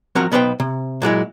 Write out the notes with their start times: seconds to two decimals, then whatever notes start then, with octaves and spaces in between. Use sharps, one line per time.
0.15 F3 C4 F#4 A#4 F#5 A#5
0.32 B1 B3 B4 C5 D#5 G5
0.60 C3
1.02 A#2 F#3 G#3 E4